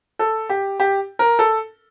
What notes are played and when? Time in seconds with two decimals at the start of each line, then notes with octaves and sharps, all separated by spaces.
0.19 A4
0.49 G4
0.80 G4
1.19 A#4
1.39 A4